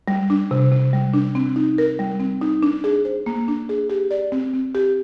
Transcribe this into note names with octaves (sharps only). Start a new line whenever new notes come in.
G3
D4
C3
C3
G3
D4
C4
D#4
A#4
G3
C4
D#4
D4
G#4
C5
A#3
D4
G#4
G4
D5
C4
C4
G4